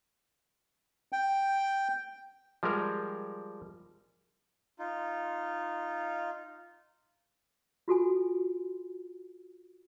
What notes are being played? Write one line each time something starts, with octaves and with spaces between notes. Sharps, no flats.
G5
F3 G3 G#3 A#4
D#4 F4
F4 F#4 A4 G#5